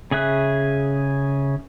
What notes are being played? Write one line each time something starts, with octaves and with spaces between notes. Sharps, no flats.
C#3 G#4 E5 F#6